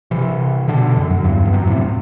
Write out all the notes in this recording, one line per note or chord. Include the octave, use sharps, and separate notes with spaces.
C3 E3
B2 D3
F#2
F#2
E2 G2
E2
F#2
A2 C3